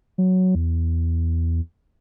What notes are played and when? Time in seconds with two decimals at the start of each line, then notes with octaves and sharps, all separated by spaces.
0.18 F#3
0.55 E2